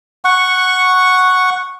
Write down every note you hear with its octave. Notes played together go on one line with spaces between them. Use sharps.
F#5 C#6